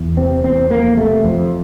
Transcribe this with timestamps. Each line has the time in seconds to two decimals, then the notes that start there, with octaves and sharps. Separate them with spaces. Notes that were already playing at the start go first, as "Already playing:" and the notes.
Already playing: E2
0.17 C3 C4
0.44 E2 C4
0.70 F2 A#3
0.97 C3 A3
1.24 F2 F3